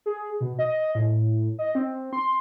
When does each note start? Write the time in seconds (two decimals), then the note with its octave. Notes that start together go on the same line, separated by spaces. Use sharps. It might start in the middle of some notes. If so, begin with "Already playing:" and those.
0.06 G#4
0.41 B2
0.59 D#5
0.95 A2
1.59 D#5
1.75 C4
2.13 C6